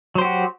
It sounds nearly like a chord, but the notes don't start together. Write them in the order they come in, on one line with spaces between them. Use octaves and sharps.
F#3 C5 G4 F#4